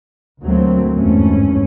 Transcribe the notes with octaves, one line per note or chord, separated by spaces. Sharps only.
D2 F#3 A3 A#3 C4
G1 E2 G#2 A3 C#4